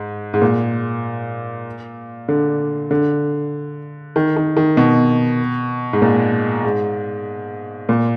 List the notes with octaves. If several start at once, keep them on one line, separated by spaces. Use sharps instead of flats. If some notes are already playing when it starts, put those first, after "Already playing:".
Already playing: G#2
G#2
A#2
D3
D3
D#3
D#3
D#3
B2
G#2
A#2
G#2
A#2